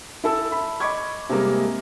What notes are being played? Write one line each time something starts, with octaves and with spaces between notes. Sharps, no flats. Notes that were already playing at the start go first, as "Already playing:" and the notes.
E4 A4 E6
B5
D#5 B5 C#6 D6 G#6
C3 G3 G#3 A#3